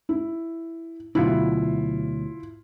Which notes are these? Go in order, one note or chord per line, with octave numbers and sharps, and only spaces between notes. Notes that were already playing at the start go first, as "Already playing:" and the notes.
E4
D2 B2 F#3 E4 F4